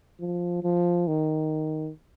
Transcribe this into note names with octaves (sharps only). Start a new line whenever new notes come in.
F3
F3
D#3